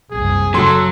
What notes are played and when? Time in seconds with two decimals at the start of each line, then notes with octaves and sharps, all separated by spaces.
0.11 F#1 C2 G#4
0.54 C#3 F#3 A4 C6